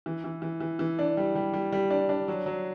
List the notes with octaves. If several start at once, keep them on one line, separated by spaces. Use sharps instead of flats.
E3
E3
E3
E3
E3
D4
G3
G3
G3
G3
D4
D4
F#3
F#3